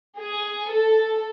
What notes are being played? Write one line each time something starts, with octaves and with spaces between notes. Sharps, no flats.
G#4
A4